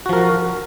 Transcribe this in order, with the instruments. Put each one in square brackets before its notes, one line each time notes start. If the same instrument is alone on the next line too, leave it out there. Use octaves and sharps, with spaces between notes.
[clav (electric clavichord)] F#4
F3
A#4